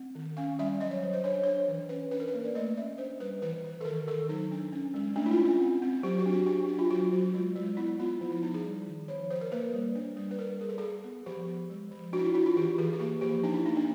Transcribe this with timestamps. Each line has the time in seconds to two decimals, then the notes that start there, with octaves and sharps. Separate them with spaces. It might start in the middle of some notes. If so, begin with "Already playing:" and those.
Already playing: C4
0.15 D#3
0.37 C#4 F5
0.59 G3 E5
0.80 F#3 D#5
0.91 C#5
1.02 F#3 C5
1.13 C5
1.24 D4 C#5
1.34 C5
1.44 C#5
1.46 D4
1.68 E3
1.89 C#4 B4
2.11 D4 B4
2.20 A#4
2.28 B4
2.34 A#3
2.45 D5
2.55 A3 D#5
2.77 C#4 E5
2.98 D4 C5
3.20 G3 B4
3.42 E3 B4
3.64 E3
3.81 A4
3.85 D#3 A#4
4.07 D#3 A4
4.29 F#3 D#4
4.52 D4
4.72 C#4
4.94 G#3
5.16 A3 D4
5.26 E4
5.31 F4
5.37 C#4
5.45 F4
5.60 C4
5.82 C4
6.03 F#3 G4
6.18 F#4
6.26 D4
6.32 F#4
6.46 D4 G4
6.68 D4
6.79 F4
6.90 F#3 F#4
7.12 F#3
7.34 G#3 F4
7.55 G#3
7.77 B3 E4
7.99 B3 F4
8.21 F3 E4
8.32 E4
8.43 F3 D#4
8.54 G#4
8.64 G3
8.87 D#3
9.08 F3 C#5
9.30 F3 C5
9.41 A#4
9.52 A#3 B4
9.73 G3
9.95 D4
10.17 G3
10.31 B4
10.38 G3 A#4
10.61 G3 G#4
10.69 A4
10.78 G3 G#4
11.04 B3
11.26 F3 G4
11.47 F3
11.70 G#3
11.91 F3
12.13 D4 F#4
12.19 E4
12.24 F4
12.34 D4 E4
12.46 F4
12.56 E3 G4
12.78 E3 G#4
12.93 G#4
13.00 A#3 G4
13.21 F3 G4
13.43 D4 D#4
13.54 E4
13.66 A#3 D#4
13.77 D4